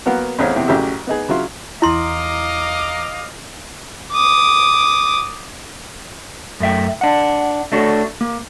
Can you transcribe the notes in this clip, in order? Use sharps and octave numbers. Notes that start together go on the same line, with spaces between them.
F#3 A#3 B3 A#4 F5 F#5
A1 E2 C4 C#5 F5
E2 C3 G5
A1 C#3 F#3 G4 E5
B3 D#4 G#4
C#3 F#3 E4 F4
E2 E4 D#5 F5 A#5 C6 D6
D6 D#6
F#2 A3 E5 G5
D4 F#5
A3 D4 F#4 A4 C#5
A#3